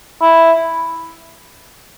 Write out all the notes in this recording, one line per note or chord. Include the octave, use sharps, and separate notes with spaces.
E4